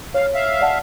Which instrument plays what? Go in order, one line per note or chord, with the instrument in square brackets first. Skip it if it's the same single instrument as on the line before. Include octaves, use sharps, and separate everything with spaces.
[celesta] C#5 [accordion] F5
[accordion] E5 F5
[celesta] D5 F#5 A5